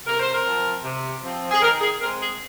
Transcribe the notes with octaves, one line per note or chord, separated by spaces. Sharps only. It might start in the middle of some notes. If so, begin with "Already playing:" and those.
C3 A#4
C5
A#4
F3 C4
C3
F3 C4
G#4
D#3 A#4
G#4
G#3 C4 A#4
G#4